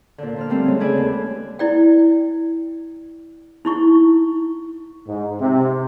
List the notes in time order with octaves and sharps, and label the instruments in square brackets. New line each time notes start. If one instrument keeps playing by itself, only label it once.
[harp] A#2 D3
A#2 F3 F6
G3 A3 C4 C5
C#3 G#3 C#4
G#4 A4 B4 D5 G#5
D#2
[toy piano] E4 D5 G5
D#4 E4 C#6
[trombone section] G#2
C3